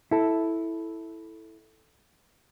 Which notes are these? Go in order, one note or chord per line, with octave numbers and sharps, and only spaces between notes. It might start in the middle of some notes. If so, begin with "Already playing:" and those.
E4 A4